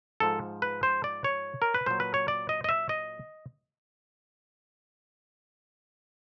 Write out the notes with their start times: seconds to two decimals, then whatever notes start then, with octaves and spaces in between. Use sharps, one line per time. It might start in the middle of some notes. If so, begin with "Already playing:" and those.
0.20 G#2 F3 A4
0.62 B4
0.83 C5
1.04 D5
1.24 C#5
1.62 A#4
1.74 B4
1.86 A#2 F#3 C5
2.00 B4
2.14 C#5
2.28 D5
2.49 D#5
2.64 D#5
2.69 E5
2.89 D#5